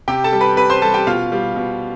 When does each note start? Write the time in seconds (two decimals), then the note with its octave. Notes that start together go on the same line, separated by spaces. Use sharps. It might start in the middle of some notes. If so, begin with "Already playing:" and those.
0.08 C3 G4 G5
0.24 A4 A5
0.32 G3
0.41 B4 B5
0.57 C3 B4 B5
0.70 C5 C6
0.82 G3 A4 A5
0.94 G4 G5
1.07 B2 F4 F5
1.32 G3
1.56 B2